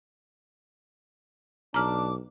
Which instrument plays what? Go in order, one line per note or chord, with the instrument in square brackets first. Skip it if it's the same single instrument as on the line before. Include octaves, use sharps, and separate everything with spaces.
[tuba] B1 [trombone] D4 [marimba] A#5 F6 [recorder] D6